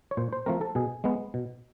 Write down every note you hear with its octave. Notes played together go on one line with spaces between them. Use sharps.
C#5
A#2 C5
C5
F3 A3 C4 A#4
A4
B2 G#4
G#3 B3
B2